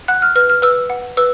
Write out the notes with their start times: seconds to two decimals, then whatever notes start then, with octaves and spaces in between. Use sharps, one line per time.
0.08 F#5 F#6
0.22 F6
0.36 B4 F6
0.50 F6
0.62 B4 E6
0.90 F#5
1.17 B4 E6